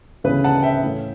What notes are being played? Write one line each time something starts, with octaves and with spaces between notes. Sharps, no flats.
D2 C#3 E3 B3 B4
F#5 A5
E5 G5
A2 E3 A3